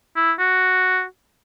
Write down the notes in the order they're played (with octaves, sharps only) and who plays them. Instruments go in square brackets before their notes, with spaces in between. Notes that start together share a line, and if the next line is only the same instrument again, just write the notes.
[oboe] E4
F#4